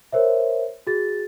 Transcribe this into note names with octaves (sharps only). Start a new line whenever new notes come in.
A#4 C5 C#5 E5
F#4 G#4 A6